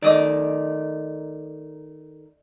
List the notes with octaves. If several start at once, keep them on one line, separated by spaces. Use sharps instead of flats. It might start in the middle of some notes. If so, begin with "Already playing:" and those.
D#3 A3 D5 D#5 D6